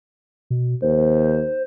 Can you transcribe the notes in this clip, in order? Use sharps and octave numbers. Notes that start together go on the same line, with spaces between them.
B2
D#2 C5